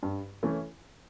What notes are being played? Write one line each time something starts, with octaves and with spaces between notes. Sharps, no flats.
G2
E3 A3 C#4 E4